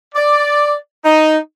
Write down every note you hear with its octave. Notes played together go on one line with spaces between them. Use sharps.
D5
D#4